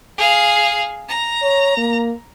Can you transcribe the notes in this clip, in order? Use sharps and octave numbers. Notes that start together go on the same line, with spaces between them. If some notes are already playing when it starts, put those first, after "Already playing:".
G#4 F5
A#5
C#5
A#3